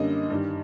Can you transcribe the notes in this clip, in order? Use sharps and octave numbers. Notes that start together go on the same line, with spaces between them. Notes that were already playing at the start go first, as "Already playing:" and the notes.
Already playing: F#2 D3 G3 A#3 D#5
G2 D#3 G3